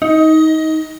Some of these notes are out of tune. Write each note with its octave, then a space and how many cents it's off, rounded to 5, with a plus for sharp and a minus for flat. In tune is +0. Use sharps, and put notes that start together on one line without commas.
D#4 +20